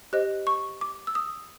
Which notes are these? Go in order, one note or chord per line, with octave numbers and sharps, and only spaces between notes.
G4 C5 D#5 F#6
C#6
D6
E6
D#6